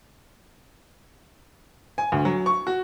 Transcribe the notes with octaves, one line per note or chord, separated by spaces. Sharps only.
G#5
D2
F#3
C#6
F#4